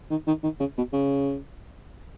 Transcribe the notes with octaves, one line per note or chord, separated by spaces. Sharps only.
D#3
D#3
D#3
C#3
B2
C#3